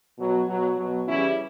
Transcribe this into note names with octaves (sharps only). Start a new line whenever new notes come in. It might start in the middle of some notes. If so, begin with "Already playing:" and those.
B2 F#3
B2 F#3
B2 F#3
C#3 E3 G3 C#4 E4